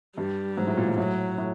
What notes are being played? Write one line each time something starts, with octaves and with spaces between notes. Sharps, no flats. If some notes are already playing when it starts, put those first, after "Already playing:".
G2 G3
G#2 F#3
A2
A#2
G#2
A2 F#3
A2